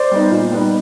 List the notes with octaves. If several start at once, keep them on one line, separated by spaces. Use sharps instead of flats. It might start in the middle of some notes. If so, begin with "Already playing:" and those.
Already playing: C5 D5
G3 B3 D#4
A#2
G3 B3 D#4